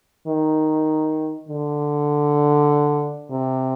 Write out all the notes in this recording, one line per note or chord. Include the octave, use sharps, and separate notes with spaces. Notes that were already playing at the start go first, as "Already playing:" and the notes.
D#3
D3
C3